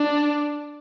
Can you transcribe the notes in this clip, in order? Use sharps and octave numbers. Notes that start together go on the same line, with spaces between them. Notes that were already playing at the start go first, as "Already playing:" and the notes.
Already playing: D4